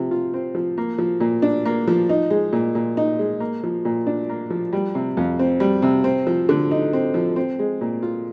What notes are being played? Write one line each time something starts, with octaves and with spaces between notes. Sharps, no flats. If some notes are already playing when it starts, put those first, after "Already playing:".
Already playing: C3 F3
F4
C4
F3
A#3
F3
A#2
D4
A#3
F3
D#4
G#3
A#2
A#2
D#4
G#3
A#3
F3
A#2
D4
A#3
F3
G3
C3
F2
C4
G3
C3
C4
F3
D3
D#4
C4
F3
C4
G#3
A#2
F4